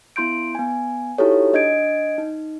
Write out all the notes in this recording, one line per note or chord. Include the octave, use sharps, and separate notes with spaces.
B3 E4 C6 G6 D7
B3 G#5
D#4 E4 F#4 G4 A4 C#5
D4 D#5 G6 G#6 D7
D#4